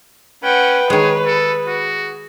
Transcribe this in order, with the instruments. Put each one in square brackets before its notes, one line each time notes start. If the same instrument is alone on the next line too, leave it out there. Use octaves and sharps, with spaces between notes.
[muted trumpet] C#4 [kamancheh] B4 [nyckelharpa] F#5 G5
[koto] D#3 G#3 [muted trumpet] G#4 [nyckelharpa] C#5
[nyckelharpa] G#4 [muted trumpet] A4
[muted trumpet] F#4